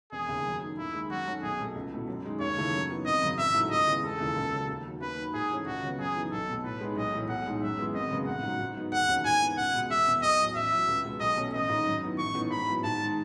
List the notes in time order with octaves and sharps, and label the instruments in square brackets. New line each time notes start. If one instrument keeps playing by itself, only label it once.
[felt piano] E1 [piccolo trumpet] G#4
[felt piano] D#2 C#3
F#2
D#3 A3
[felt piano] D#2 [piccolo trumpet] E4
[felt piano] D#3 G#3 D#4
[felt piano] F#2 [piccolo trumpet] F#4
[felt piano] D#3 A3 C#4
[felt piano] B1 [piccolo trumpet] G#4
[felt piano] B2 A3
C#2
B2 A3 E4
F#2
D#3 G#3 D#4
[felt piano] D#2 [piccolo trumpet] C#5
[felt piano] C#3 E3 A3 D#4
F#2
E3 B3 D#4
[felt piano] G#1 [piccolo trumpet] D#5
[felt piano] F#2 C#3
[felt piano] A1 [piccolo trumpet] E5
[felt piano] G#2 F#3 A3 E4
[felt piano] C#2 [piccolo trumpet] D#5
[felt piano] C#3 G#3 B3 E4
[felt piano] E1 [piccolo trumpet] A4
[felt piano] D#2 C#3 E3 G#3
C#2
C#3 F#3
D#2
D#3 F#3
[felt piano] D#2 [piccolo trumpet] B4
[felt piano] D#3 F#3
[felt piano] G#2 [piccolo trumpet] G#4
[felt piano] E3 A3 C#4
[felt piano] C#2 [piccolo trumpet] F#4
[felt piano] C#3 F#3 B3
[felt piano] F#2 [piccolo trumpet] G#4
[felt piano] E3 B3 D#4
[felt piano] B1 [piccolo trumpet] A4
[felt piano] B2 A3
[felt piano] A2 [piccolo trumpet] B4
[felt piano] G#3 B3 D#4
[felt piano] B1 [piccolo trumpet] D#5
[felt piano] A2 E3 A3
[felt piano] B1 [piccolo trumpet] F#5
[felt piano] A2 G#3 D#4
[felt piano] F#2 [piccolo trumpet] E5
[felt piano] E3 G#3 B3
[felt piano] G#1 [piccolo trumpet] D#5
[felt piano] F#2 C#3 G#3 B3
[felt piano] A1 [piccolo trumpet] F#5
[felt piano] G#2 F#3
G#2
F#3 B3 D#4
[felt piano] E1 [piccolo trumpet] F#5
[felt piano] D#2 D#3 F#3 C#4
[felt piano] G#2 [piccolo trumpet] G#5
[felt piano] E3 B3 D#4
[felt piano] C#2 [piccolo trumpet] F#5
[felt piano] B2 G#3
[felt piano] E1 [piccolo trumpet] E5
[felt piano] E2 B2
[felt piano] B1 [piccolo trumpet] D#5
[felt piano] A2 F#3
[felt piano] A1 [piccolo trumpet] E5
[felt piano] A2 F#3
C#2
B2 G#3 B3
[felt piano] B1 [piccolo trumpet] D#5
[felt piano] B2 A3 C#4
[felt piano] A1 [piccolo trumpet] D#5
[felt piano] G#2 D#3
F#2
D#3 F#3 B3 E4
[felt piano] A1 [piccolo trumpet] C#6
[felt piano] A2 E3 B3 D#4
[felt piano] G#2 [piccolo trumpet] B5
[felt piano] F#3 B3 E4
[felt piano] G#2 [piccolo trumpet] A5
[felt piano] D#3 G#3